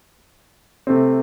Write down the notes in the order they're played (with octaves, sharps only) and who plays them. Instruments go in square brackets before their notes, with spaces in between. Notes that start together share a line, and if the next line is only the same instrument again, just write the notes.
[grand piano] C3 A3 C4